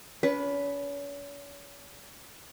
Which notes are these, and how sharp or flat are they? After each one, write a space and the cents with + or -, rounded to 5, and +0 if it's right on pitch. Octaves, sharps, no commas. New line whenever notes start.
C#4 +40 B4 +0